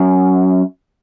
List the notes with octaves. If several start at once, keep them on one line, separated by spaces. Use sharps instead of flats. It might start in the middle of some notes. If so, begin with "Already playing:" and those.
Already playing: F#2